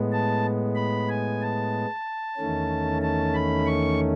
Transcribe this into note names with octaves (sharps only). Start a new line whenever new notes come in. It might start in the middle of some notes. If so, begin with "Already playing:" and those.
Already playing: A2 G#3 B3
A5
B5
G#5
A5
E2 D#3 A3 C#4
A5
B5
C#6